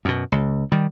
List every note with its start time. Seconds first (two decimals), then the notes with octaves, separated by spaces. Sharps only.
0.05 F#2 B2
0.32 C#2
0.72 D#3 G3